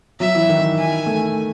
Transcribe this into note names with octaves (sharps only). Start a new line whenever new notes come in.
F#3 E5
E3
D#3
G#5
A3